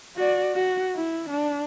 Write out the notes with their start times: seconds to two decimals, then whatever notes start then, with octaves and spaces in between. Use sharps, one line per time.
0.16 F#4 D5
0.55 F#4
0.96 E4
1.30 D4